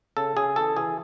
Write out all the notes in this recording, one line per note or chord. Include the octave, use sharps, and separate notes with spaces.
C#3 A4
C#3 G#4
E3 A4
E3 G#4